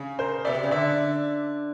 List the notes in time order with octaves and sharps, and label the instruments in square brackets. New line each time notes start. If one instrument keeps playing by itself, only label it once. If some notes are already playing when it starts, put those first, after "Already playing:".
Already playing: [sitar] C#3
[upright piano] A#4 C5
[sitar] B2 [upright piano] D5 E5
[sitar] C3
C#3
[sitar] D3 [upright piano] D5 E5